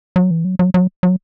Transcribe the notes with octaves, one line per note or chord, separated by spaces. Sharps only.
F#3
E3
F#3
F#3
F#3
F#3